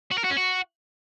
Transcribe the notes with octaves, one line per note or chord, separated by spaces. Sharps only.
F#4
A#4
F#4
C#4
F#4